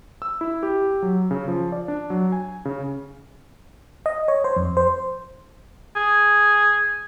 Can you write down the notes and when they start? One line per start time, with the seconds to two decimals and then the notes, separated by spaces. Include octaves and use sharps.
0.22 E6
0.41 E4
0.63 G4
1.02 F#3
1.31 C#3
1.48 F3
1.72 D5
1.88 D4
2.10 F#3
2.32 G#5
2.65 C#3
4.06 D#5
4.28 C#5
4.44 C5
4.57 F2
4.77 C5
5.96 G#4